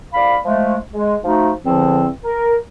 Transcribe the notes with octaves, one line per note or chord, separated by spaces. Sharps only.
C2 D5 F5 B5
F3 G#3 A3
G#3
F3 A3 D#4 F#4
E2 D3 F3 C4
A#4